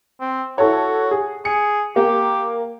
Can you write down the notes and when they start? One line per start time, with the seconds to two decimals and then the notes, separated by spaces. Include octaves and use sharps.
0.20 C4
0.58 E4 F#4 A4 C#5
1.11 G#4
1.45 G#4 C#7
1.96 A#3 G4